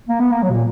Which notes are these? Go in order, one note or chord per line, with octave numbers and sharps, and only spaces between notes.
A#3
B3
A#3
F#3
B2
A#2